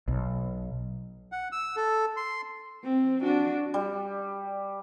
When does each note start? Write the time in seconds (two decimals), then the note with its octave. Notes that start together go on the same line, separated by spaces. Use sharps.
0.08 B1
1.32 F#5
1.52 E6
1.76 A4
2.17 C6
2.84 C4
3.23 D4 F#4
3.74 G3